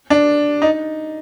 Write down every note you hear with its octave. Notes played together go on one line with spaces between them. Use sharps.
D4
D#4